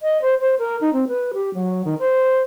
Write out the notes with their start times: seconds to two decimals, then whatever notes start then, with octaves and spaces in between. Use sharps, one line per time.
0.02 D#5
0.22 C5
0.41 C5
0.59 A#4
0.81 D#4
0.93 C4
1.08 B4
1.34 G4
1.54 F#3
1.85 D#3
1.99 C5